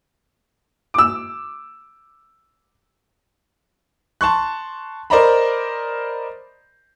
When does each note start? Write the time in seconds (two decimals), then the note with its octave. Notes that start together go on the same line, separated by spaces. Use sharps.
0.94 D6 E6
4.21 A5 C6 C#6 F#6
5.10 A#4 C5 D5 D#5 A#5 B5